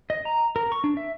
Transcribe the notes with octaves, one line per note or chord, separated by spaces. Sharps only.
D#5
A#5
A#4
C#6
D4
E5